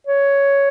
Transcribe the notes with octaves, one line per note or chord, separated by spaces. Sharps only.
C#5